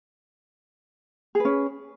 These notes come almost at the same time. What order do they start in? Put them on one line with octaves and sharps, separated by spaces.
G#4 B4 C#4